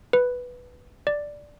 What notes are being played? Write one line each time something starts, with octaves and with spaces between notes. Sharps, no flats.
B4
D5